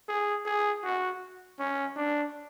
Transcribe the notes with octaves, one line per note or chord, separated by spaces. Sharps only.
G#4
G#4
F#4
C#4
D4